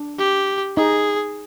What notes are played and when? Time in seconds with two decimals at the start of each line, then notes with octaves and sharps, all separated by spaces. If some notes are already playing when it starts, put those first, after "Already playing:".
Already playing: D4
0.19 G4
0.77 D#4 G#4